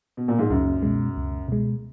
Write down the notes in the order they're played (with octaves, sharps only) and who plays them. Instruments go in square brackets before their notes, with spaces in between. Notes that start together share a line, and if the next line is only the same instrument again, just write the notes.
[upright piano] B2
A#2
G#2
[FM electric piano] C#2 [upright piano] F#2
[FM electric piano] B2 G#3
C#2
B2 G#3